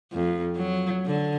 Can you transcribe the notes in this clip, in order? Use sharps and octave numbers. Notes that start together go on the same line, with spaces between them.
F2
F#3
D3